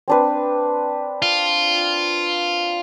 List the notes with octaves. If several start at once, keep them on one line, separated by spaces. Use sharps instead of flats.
C4 D4 B4
F4